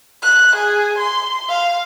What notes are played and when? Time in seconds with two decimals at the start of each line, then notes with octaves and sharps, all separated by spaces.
0.23 F#6
0.56 G#4
0.99 C6
1.49 F5